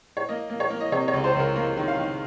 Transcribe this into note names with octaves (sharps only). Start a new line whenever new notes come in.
C#5
A#3 D#5
A#3
C#5
A#3
D#5
C3 C#5
C#5
C#2
C5
C#2 A#4
A#3 A#4
D#3
F5
D#3